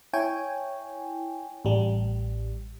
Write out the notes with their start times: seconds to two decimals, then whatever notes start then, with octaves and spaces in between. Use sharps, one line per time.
0.13 E4 C#5 G5 G#5
1.65 A1 G3